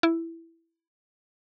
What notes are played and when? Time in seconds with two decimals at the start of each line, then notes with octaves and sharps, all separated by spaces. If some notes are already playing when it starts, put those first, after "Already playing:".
0.03 E4